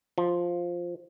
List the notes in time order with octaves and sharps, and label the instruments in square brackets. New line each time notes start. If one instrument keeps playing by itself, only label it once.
[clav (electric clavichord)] F3